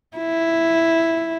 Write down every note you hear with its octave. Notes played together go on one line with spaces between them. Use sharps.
E4